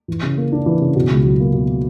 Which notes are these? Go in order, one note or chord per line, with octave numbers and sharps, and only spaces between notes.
E3
C#3
A#3
D4
E3
C#3
B2
C#2
F#3
A#3
B2